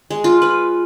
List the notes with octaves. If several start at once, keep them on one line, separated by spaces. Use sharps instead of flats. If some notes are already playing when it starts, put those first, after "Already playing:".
G#3
F4
B4